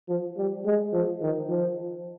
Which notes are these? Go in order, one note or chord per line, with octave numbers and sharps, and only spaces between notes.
F3
G3
G#3
F3
D#3
F3